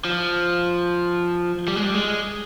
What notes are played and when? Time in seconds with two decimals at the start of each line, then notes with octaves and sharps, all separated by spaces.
0.05 F3
1.68 G3
1.76 G#3
1.85 G3
1.94 G#3